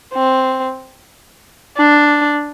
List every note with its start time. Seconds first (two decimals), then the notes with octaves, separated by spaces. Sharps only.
0.14 C4
1.77 D4